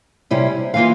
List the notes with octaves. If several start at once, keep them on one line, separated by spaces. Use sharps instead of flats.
C3 G3 C#4 E4
E3 A#3 F4 F5